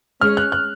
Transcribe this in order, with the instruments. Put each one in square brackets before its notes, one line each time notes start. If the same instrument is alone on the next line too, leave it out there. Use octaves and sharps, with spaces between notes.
[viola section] G#3 C#4 G#4 C#5 [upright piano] F6
[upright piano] F#6
F#6